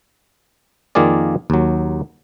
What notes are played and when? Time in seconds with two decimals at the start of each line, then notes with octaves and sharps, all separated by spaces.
0.95 F2 D#3 A#3 F4 G#4 D5
1.50 D#2 F#3